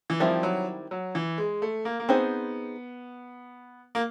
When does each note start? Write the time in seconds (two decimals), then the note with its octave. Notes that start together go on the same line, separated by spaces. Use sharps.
0.10 E3
0.20 D#3 F3 G3 C4 E4
0.43 F#3
0.91 F#3
1.15 E3
1.38 G#3
1.62 A3
1.85 A#3
2.00 A#3
2.09 B3 C4 D#4 G#4 C5
3.95 A#3